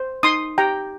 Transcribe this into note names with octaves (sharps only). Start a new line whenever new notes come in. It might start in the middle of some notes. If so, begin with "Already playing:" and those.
Already playing: C5
D#4 C6 D#6
G4 G5 A#5